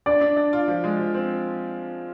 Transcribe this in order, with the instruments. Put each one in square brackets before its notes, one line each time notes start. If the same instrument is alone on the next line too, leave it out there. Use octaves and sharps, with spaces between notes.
[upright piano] D4 [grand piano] D5
[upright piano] D4
D4
F4
F3
G#3
F3
C4